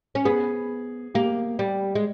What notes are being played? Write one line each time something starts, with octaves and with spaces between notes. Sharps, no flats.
C#4
B3 G#4
A#3 G4
G3
G#3